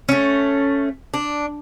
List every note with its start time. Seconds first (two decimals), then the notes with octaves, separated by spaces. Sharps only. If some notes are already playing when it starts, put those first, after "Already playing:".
0.09 A3 C#4
1.14 D4